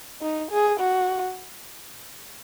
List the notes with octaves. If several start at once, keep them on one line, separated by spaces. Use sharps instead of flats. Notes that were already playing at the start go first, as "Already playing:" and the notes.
D#4
G#4
F#4